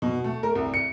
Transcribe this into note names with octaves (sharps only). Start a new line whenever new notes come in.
B2
A3
A#4
C2
C#7